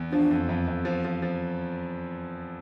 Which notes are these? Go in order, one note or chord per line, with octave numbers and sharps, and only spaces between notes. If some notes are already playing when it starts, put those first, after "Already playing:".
Already playing: E2
F3 D4
F2
F2
F2
F3
F3
F3